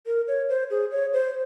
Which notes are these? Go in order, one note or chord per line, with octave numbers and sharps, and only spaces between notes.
A#4
C#5
C5
G#4
C#5
C5